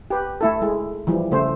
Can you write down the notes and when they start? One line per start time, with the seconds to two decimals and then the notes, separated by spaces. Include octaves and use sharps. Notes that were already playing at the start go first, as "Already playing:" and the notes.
0.10 G4 B4
0.41 A3 E4 A4
0.62 G#3 E4
1.07 E3 F3 G3
1.31 C#3 A3 C5